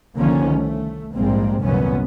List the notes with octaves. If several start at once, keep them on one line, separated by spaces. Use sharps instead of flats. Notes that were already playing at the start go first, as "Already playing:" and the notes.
C2 D3 D#3 F3 A#3 C#4
A3
A#1 G#2 G3 G#3 A#3 C4
C2 F#2 A#2 D#3 B3 C#4